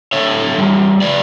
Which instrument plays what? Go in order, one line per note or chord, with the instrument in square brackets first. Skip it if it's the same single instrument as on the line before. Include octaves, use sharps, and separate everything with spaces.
[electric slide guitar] D3 C#5 E5
G3
C#3 B4 D5